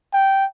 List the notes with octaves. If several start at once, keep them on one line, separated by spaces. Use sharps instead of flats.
G5